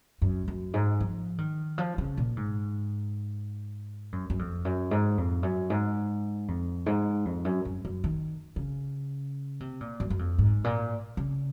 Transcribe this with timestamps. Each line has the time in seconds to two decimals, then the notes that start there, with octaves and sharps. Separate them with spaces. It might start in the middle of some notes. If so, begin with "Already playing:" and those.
0.22 F#2
0.48 F#2
0.74 G#2
1.00 F3
1.38 D#3
1.78 F3
1.98 C#3
2.17 A#2
2.37 G#2
4.12 F#2
4.30 F#2
4.39 F2
4.65 F#2
4.91 G#2
5.18 F2
5.43 F#2
5.70 G#2
6.48 F2
6.86 G#2
7.25 F2
7.45 F#2
7.65 F#2
7.85 F#2
8.04 D#3
8.56 C#3
9.60 C3
9.81 A#2
10.00 F#2
10.10 F#2
10.19 F2
10.38 G#2
10.64 A#2
11.17 C#3